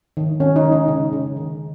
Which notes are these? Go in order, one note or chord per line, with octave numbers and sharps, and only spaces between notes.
D#3
D#3 C#4
D#4
D#3
D#4
C#3
C#3
D#3